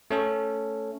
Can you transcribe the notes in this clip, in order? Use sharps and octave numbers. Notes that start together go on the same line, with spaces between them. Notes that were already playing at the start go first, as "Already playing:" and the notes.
A3 C#4 A4